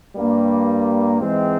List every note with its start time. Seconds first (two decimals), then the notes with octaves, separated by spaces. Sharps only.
0.16 G2 G3 A#3
1.20 G#2 E3 G#3 C4